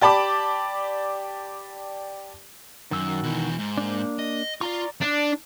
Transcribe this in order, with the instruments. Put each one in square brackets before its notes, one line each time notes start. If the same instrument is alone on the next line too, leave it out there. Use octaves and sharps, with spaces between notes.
[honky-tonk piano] G4 D5 A5 B5 D6
[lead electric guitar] F#2 [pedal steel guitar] D#3 F#4 E6
[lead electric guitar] B2 E3
G#2
[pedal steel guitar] A#3 D4
[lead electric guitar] D#5
[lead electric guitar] F4 [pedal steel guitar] D5 A#5 C#6
[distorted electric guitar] D4